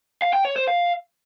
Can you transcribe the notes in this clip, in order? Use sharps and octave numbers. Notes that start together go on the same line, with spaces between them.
F5
G5
C#5
C5
F5